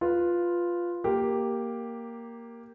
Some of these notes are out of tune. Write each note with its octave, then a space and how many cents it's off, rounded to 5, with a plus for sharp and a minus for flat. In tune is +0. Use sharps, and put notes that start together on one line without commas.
F4 +0 B4 +0
A#3 +0 G4 +0